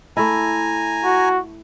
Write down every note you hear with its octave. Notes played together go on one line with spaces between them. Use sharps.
A3 E4 G#5 A#5
F#4